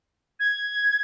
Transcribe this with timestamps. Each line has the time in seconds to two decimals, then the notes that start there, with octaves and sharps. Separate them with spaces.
0.39 G#6